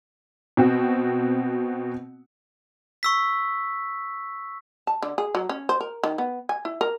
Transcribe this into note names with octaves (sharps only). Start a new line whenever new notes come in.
B2 C4 F#4
C#6 E6 B6
A5
D3
G#4
F#3
C#4
C5
A#4
D#3
B3
G#5
E4
A#4